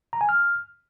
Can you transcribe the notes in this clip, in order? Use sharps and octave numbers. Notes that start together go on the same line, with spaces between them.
A#5
G#5
F6